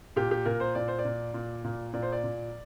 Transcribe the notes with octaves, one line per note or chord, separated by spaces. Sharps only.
A#2 G4
G4
A#2 A#4
C5
A#2 D5
C5
D5
A#2
A#2
A#2
A#2 D5
C5
D5
A#2